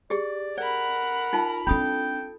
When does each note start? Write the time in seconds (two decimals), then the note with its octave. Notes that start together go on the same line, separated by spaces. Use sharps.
0.10 G4 G#4 D5
0.58 A#4 D5 F#5 B5
1.33 D#4 F4 A5
1.67 C4 D4 A4 G5 B5 D#6